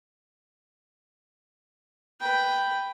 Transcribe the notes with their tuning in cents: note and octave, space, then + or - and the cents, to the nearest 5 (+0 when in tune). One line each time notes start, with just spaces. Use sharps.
B4 +5 G5 +0